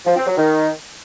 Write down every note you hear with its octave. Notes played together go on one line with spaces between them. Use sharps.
F3
C4
F#3
D#3